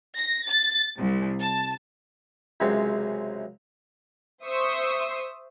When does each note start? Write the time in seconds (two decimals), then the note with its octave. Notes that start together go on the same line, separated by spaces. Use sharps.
0.18 A#6
0.48 A6
0.95 C2
1.40 A5
2.60 C#2 F#2 C3 G#3 C4
4.45 C5 E5 C6 C#6 D#6 E6